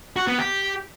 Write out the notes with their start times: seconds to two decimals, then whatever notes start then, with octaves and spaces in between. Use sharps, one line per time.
0.16 F#4
0.27 B3
0.38 G4